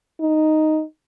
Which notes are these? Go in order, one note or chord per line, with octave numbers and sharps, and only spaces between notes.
D#4